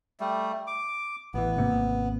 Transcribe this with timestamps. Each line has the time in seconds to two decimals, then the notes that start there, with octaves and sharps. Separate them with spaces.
0.20 G3 A3
0.67 D6
1.34 A1 E3 B3
1.57 G#1 C3 A#3